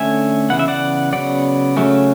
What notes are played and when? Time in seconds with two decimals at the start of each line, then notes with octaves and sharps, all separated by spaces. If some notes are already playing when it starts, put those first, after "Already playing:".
Already playing: D3 A3 C#4 E5 G#5
0.50 C#3 E3 B3 F#5
0.59 E5
0.68 D5 F#5
1.13 C#3 F#3 B3 D5 F#5
1.77 C#3 F#3 A3 C#4